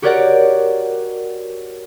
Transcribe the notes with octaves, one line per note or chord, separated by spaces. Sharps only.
F#4 G4 A#4 C#5 D5 F#5